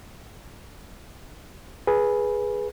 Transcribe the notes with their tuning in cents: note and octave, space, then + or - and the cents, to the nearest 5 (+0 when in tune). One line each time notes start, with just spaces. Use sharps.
G#4 +0 B4 -10